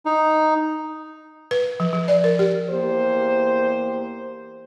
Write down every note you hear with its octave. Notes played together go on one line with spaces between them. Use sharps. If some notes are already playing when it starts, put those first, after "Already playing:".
D#4
B4
F3
F3
D5
A#4
G4
E2 A#3 G4 C5